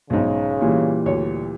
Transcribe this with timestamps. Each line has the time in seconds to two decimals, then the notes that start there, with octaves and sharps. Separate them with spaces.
0.10 B1 G#2 C#3
0.61 A#2 E3 G3
1.06 D2 C#5